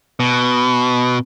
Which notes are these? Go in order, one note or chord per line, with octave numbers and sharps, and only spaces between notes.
B2